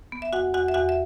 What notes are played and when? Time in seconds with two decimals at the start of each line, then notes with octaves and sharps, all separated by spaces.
0.12 B3
0.22 E5
0.33 E2 F#4 F#5
0.54 E2 F#4 F#5
0.68 E5
0.74 E2 F#4 F#5
0.89 E5